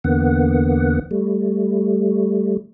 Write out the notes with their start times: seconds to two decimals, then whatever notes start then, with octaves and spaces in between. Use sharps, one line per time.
0.04 E2 D3 A#3 B3 F#5
1.11 G3 A3